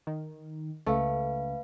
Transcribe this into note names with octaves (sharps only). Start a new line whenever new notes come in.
D#3
C#2 A3 B4 F5